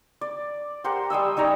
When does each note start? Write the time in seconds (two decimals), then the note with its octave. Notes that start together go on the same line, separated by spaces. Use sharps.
0.21 D5
0.84 G4 A#4 C5 F#5
1.10 G3 D#5 G#5 E6
1.37 G3 D#4 C#5 A#5